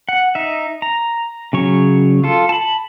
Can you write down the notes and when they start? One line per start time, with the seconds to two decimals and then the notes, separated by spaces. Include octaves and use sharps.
0.09 F#5
0.35 D#4 E5
0.82 A#5
1.53 C#3 F#3 C#5
2.24 F4 A4
2.49 A5 B5